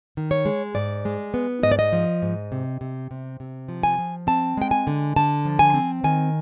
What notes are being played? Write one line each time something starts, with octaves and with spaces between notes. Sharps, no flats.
D#3
C#5
G#3
G#2 D5
G#3
B3
G#2 D#5
D5
D#5
F3
G#2
C3
C3
C3
C3
F3
G#5
F3
C4 A5
G#3 G5
G#5
D3
D3 A5
F3
G#5
C4
D#3 G#5